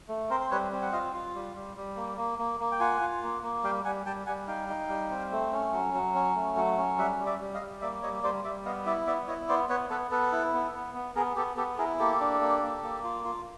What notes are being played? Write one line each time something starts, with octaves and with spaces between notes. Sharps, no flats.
A3
C4 A#4 C5
C5
G3 B4 C#5
C4
F#5
F4 D#5 F5
F4
G3
G3
G3
A#3
A#3
A#3
A#3
G5
F4 F#5 G#5
F4
A#3
A#3
G3 F5 G5
G3 F#5 G#5
G3 G5 A5
G3 F#5 G#5
D#4 F5 G5
D#4
G3
C4
A3
C#4
F#3
F#3
C#4
A3
F#3
C#4
G3 E5 F#5
G3
D5 E5
G3
D#5 F5
G3
A#3 D5 E5
G3 C#5 D#5
G3 C5 D5
G3 D5 E5
B3 D#5 F5
E4 D5 E5
B3 D5 E5
E4 C#5 D#5
B3 C5 D5
B3 B4 C#5
B3 A4 B4
B3 A4 B4
E4
B3
B3
B3
B3 G#4 A#4
B3 G4 A4
B3 G4 A4
E4 G#4 A#4
A#3 G4 A4
D4
A#3
A#3
A#3
F4
F4